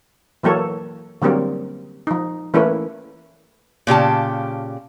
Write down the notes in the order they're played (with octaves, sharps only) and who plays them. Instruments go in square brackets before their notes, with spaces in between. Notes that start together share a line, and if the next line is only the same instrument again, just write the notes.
[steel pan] E3 F#3 A#3 A4 C#5
D3 F#3 G3 A#3 C4
F3 D#4
E3 A3 A#3 C#4 E4 B4
[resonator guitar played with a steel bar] A#2 C#3 G4 A5